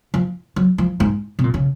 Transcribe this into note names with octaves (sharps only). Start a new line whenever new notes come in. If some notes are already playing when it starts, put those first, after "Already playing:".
F3
F#3
F3
G#2
C3
A#2
C#3